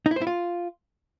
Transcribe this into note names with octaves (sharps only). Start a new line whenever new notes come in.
D#4
E4
C5
E4
F4